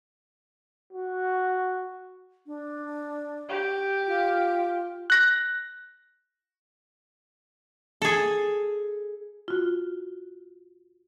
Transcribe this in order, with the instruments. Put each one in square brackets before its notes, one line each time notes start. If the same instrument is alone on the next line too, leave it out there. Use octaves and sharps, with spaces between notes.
[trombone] F#4
[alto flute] D4
[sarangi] G4
[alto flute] F4
[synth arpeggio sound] F#6 A#6
[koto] G#4 A4
[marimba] F4 F#4